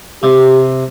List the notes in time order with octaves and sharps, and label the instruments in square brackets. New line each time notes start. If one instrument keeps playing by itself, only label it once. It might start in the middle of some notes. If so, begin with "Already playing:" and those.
[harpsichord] C3 [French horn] G4